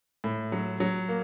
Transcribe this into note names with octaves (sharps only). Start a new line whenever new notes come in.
A2
F#3
F#3
A#3